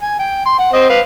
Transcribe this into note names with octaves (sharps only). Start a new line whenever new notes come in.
G#5
G5
C6
F#5
C4 C5 D#5
B4 F5